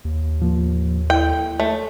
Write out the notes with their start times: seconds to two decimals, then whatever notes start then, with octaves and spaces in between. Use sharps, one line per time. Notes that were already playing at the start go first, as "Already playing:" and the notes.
0.05 D#2
0.40 A2 F3 A#3
1.10 E4 A4 G5
1.60 A3 C#5